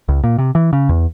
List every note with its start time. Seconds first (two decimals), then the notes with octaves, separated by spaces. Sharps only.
0.09 C#2
0.24 A#2
0.38 C3
0.55 E3
0.73 C#3
0.89 E2